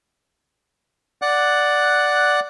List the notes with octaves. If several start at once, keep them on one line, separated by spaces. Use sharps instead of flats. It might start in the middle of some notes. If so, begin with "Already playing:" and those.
D5 F#5 F#6